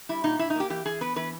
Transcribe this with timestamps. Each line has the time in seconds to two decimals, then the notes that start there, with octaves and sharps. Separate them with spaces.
0.09 G3 E4
0.24 A#2 D#4
0.39 A#2 E4
0.50 D#4
0.56 A#3 G4
0.70 E3 G4
0.85 E3 G#4
1.01 B3 B4
1.16 E3 B4